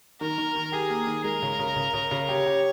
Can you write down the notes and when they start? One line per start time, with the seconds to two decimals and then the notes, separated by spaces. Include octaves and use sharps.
0.21 D#3 A#4
0.38 D#3
0.55 D#3
0.72 G4 G#4
0.90 A#3
1.07 D#3
1.24 G#3 A#4
1.42 C#3
1.59 C#3
1.76 C#3
1.94 C#3
2.11 C#3
2.28 G4 C#5
2.46 G4